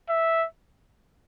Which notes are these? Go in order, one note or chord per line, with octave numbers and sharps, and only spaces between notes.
E5